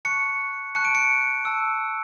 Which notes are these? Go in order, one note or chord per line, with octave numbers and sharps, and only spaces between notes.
A5 C#6 F#6 C#7
A5 C#6 F#6 C#7
D7
C#7
A5 E6